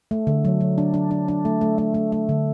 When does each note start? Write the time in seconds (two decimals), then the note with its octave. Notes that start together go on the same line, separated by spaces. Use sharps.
0.11 A3
0.27 D3
0.45 F#3
0.60 F#3
0.78 D4
0.94 D4
1.11 D4
1.28 D4
1.45 A3
1.61 A3
1.78 A3
1.94 A3
2.12 A3
2.29 D3